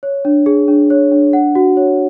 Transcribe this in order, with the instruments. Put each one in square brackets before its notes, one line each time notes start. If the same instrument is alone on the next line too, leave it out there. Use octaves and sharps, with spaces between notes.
[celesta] C#5
D4
G#4
D4
C#5
D4
F#5
F#4
C#5